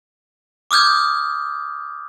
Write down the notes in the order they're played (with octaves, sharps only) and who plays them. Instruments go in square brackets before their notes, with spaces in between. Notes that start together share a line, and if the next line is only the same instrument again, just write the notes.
[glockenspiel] D6 D#6 F6 G6 G#6